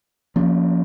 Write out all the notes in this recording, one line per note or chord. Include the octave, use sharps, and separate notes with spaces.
F3 A#3 C#4